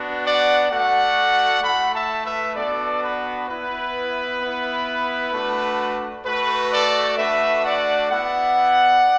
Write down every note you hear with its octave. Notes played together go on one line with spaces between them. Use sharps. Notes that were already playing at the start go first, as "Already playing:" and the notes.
Already playing: B3 D4 F#4
D5 F#5
A3 F#4 D5 F#5
A3 E4 F#5 B5
E5 A5
B4 E5
B3 D4 F#4 A4 D5
B4
B3 E4 B4
B3 E4
A3 D4 F#4
A3 F#4 B4
A4 D5
A3 D4 F#4 B4 E5
D5 F#5
B3 E4 D5 F#5